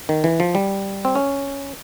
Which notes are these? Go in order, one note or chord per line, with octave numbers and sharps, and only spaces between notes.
D#3
E3
F3
G3
C4
C#4